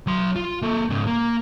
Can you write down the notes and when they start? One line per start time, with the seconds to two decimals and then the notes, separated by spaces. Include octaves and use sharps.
0.07 F#3 C6
0.36 F4
0.62 A#3 A4
0.90 G#2 C#3
1.07 A#3